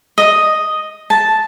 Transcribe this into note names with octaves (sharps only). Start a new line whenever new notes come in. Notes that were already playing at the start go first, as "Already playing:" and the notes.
D#5
A5